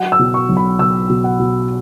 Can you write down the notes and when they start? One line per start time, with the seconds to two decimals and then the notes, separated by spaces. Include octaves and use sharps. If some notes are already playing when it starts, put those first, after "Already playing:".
Already playing: F#3 F#5
0.12 E6
0.19 B2
0.34 C#6
0.49 B1
0.57 B5
0.79 B2 E6
1.09 B2
1.24 F#5
1.39 B2